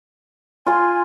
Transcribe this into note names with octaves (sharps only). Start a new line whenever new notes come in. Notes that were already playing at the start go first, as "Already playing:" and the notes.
F4 G#5 C6